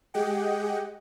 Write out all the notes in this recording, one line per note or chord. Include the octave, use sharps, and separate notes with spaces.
G#3 G4 G#4 D#5 F#5 G5